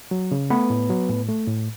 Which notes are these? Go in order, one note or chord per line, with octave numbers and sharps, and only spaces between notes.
F#3
C#3
A3 B3 B4
A2
F#3
A2
A3
A2